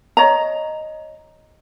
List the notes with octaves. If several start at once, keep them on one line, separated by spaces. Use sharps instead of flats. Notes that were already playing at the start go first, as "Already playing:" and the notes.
C#5 D#5 A#5